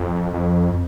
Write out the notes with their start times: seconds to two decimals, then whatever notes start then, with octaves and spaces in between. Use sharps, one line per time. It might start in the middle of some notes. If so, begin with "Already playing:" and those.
Already playing: F2
0.33 F2